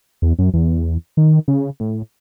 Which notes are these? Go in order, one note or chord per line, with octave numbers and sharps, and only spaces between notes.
E2
F#2
E2
D#3
C#3
A2